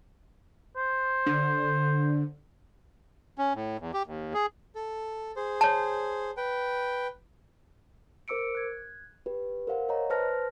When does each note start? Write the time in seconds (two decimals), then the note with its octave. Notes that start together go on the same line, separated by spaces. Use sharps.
0.77 C5
1.26 D3
3.38 C#4
3.55 A2
3.80 E2
3.94 G4
4.07 D#2
4.34 G#4
4.75 A4
5.36 G#4 C5
5.61 C#5 A5
6.37 B4 G5
8.28 A#4 C5 D6 E6 C#7 D7
8.55 F#6 G#6
9.26 G4 B4
9.67 A#4 C5 F5 F#5
9.89 C#5 D#5 A#5
10.10 B4 C5 A5 F6 F#6 A#6